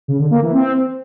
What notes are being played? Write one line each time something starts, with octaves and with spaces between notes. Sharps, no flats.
C#3
D3
A#3
E3
C4